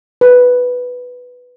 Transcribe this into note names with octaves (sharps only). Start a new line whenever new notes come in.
B4